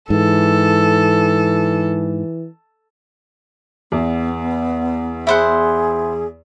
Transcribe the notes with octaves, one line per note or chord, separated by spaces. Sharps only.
G#2 E3 A4
E2 B3
E4 G#4 C5 F#5